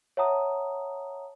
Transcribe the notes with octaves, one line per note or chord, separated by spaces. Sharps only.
C#5 E5 F#5 A5 A#5 D#6